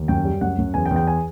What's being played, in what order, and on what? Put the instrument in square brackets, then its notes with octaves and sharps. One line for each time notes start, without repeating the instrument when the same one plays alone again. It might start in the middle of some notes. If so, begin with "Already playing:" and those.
Already playing: [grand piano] D#2
F#2 G5
G3
F#2 F#5
F#2
E2 G#5
G5
E2
G5
G#5